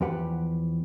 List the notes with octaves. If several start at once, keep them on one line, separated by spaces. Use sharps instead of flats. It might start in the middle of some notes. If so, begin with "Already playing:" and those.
E2 F3 G4 B4 F#5